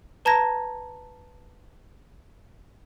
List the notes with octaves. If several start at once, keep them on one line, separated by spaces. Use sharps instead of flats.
B4 A5 A#5 G#6 A#6